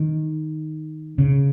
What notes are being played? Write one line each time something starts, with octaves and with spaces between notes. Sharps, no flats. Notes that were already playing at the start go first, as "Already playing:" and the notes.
Already playing: D#3
C#3